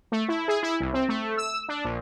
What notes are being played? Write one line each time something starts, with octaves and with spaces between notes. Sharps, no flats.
A3
E4
G#4
E4
C2
C4
A3
E6
D4
A#1